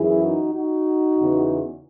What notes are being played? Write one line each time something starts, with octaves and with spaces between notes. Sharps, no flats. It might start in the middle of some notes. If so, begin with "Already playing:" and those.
Already playing: F#2 E3 E4 G#4
D#4 F#4
D#4 F#4
E2 C#3 E3